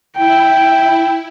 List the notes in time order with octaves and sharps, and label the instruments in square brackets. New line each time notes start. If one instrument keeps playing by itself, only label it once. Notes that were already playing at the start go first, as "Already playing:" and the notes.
[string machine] E4 [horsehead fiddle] G5